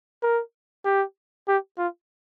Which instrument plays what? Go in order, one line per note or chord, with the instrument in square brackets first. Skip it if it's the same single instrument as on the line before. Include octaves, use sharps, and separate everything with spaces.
[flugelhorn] A#4
G4
G4
F4